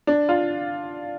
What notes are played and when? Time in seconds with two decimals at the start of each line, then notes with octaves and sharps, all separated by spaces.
0.07 D4
0.29 F4